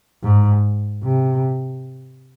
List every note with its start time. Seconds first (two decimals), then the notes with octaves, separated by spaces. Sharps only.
0.23 G#2
1.03 C3